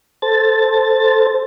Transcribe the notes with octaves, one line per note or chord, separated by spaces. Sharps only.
A4 C5 A6